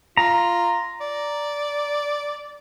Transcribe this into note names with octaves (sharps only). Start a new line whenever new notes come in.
F4 A#5
D5